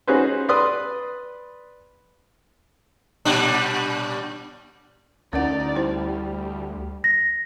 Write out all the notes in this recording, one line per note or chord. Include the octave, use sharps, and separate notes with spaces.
C#4 D#4 F#4 G#4 B4 C5
B4 D5 C6 D#6
A#2 G3 D4
D2 C#4 D#4 A#4 D5 F#5
G3 E4 C5
A#6